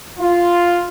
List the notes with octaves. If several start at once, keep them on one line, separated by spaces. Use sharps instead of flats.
F4